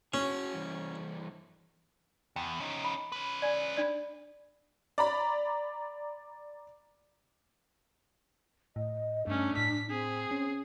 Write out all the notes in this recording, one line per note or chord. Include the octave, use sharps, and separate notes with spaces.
C#4 F#4 G#4
G2 E3
E2 G5
C#4 D#4
B5
C#4 B4
D5 G#5
D4 D5
D5 A#5 B5
A2 D#5
G2 A3 C#4 D4
A2 B6
C4 G#4
C#4